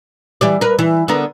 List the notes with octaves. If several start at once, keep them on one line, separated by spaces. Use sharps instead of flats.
E3 G3 D5
A#4 B4
E3
D3 B3 A#4